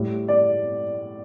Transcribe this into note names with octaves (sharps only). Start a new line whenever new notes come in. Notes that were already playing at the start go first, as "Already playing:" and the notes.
Already playing: A2 G3
D5